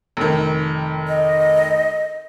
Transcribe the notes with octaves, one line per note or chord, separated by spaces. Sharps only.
F1 D#3
D#5